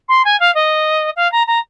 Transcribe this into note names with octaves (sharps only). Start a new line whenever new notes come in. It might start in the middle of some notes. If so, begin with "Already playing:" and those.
C6
G#5
F5
D#5
F5
A#5
A#5